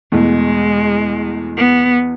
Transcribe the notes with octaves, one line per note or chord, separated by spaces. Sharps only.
E2 B2 G#3 A3
B3